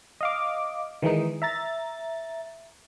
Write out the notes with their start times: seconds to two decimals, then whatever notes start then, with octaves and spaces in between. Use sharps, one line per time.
0.21 D#5 F5 D6
1.02 D#3 E3 G#3 D#4
1.42 E5 A#5 A6